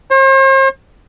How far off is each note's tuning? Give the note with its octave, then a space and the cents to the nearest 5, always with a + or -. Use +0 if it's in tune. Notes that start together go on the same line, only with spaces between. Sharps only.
C5 +45